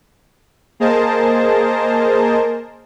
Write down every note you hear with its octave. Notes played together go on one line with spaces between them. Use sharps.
A#3 G#4 A#4 C5 D#5 A5